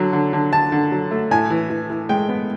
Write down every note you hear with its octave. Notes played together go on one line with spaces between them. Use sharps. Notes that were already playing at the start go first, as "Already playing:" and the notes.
Already playing: D3 F#3
D3
D3
D3 A5
D3
F#3
A3
A2 G#5
E3
E3
E3
G#3 G5
B3